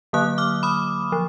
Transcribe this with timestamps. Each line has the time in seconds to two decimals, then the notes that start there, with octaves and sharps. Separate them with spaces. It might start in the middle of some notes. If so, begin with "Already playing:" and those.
0.13 D3 F#3 A#3 D#6 F#6
0.38 D6 F6
0.63 B5 D#6
1.12 F3